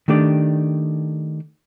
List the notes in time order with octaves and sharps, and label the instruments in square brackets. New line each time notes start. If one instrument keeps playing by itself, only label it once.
[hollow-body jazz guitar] D#3 A3 D4 G4 D5